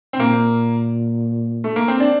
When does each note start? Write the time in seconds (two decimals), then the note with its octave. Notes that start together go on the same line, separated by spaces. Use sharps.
0.13 C4
0.19 A#2 A#3
1.64 A3
1.76 A#3
1.88 C4
2.00 D4